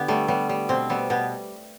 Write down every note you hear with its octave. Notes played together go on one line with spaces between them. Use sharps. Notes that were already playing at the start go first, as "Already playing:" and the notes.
Already playing: D3 B3 G4
G3 A3
G3 B3
G3
B2 C4
G3 B3
B2 B3